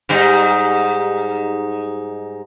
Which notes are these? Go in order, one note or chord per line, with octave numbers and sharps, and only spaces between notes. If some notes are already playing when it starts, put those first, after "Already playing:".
G#2 G3 D#4